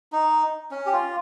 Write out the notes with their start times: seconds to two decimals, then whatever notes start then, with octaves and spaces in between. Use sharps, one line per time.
0.12 D#4
0.71 C#4
0.86 G4
0.93 F4